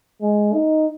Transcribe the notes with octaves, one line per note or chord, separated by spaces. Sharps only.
G#3
D#4